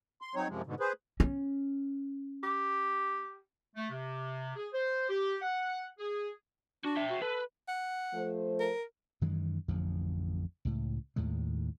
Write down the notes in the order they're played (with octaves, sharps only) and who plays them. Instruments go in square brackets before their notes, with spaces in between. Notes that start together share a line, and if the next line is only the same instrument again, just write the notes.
[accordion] C6
F#3 C4 D#4 C#5
F#2 C3 F3 G#3
G#2 B2 D3
G#4 B4 C5
[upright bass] C#4
[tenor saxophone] G4
[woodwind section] A3
C3
G#4
C5
G4
F#5
G#4
[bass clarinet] D4 [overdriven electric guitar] F#4
[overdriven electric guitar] E5 G5
[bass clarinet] F#4
[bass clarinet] A4 [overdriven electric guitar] B4
[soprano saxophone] F#5
[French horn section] F3 A3 C5
[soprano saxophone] A#4
[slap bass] F#2 D#3 E3 G#3
A1 F2 D3 F3
C#2 A2
D#2 A2 D#3 G#3